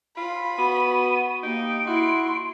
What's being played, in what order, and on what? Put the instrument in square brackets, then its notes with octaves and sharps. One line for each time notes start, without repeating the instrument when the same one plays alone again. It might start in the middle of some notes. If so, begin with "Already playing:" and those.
[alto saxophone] F4 [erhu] B5
[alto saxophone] B3 [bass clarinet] F#4 [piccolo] D#7
[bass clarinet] A#3 [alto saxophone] D#4 [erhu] G4 [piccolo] D7
[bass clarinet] E4 [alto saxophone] F#4 [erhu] C6